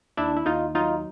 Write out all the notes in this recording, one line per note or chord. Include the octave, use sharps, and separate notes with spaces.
D#2 D4 E4
E4
D#2 D#4 F4
F#3 D#4 F4